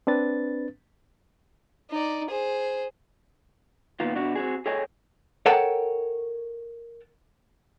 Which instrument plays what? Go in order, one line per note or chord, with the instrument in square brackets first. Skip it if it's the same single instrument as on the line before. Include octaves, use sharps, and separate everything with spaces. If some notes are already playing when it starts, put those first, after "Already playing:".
[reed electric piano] C4 D4 B4 A6
[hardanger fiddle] D#4 D5
G#4 C5
[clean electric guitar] A#2 D#3 B3 F4
B2 D4 F#4
C4 F#4 G#4
G#4 A4 C#5 D#5 G5 G#5
[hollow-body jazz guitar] A4 A#4 C#5 F#5 G5 A5